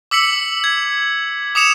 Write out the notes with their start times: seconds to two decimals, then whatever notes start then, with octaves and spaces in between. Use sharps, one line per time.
0.11 D6 E6 B6 C#7 F#7
0.64 G#6
1.55 D6 D#6 C#7 E7 F7